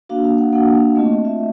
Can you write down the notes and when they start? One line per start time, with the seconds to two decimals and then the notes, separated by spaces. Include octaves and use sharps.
0.09 A#3 D4 F#4 F5
0.24 F5
0.38 F#5
0.53 A#3 D4 F#4 F#5
0.75 F5
0.96 A3 C4 F4 D#5
1.25 E5